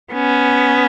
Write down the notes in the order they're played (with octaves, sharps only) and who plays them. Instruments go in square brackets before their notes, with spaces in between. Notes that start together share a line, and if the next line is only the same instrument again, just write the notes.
[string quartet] B3 C#4